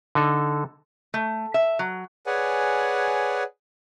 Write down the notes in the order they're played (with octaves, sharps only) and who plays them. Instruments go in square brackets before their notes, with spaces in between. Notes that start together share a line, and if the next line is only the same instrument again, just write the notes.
[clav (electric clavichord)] D3 D#4 A4
[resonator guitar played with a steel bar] A3
E5
F#3
[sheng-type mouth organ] G#4 B4 C#5 D5 F#5 G#5